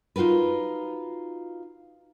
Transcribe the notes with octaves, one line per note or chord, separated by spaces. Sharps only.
D#4 F4 F#4 A#4 B4